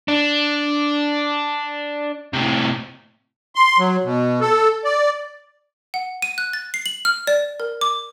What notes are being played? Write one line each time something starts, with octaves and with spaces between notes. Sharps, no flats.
D4
A2 C3
C6
F#3
B2
A4
D5
F#5
D#7
F#6
A6
C7
F#7
F6
D5
A#4
D6